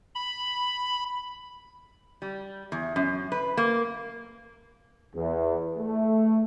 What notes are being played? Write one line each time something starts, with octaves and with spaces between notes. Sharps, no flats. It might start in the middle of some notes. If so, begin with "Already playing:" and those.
B5
G3
E2
F#2
B4
A#3
E2
A3